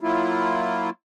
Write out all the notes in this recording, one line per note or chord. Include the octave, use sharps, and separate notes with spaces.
F#3 A#3 E4 F4